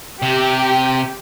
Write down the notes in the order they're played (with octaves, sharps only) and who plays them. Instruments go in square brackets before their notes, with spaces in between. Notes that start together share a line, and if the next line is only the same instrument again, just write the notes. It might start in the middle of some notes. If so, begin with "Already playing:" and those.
[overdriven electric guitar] C3 [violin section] G4